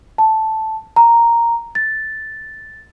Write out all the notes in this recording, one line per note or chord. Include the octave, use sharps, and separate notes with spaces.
A5
A#5
A6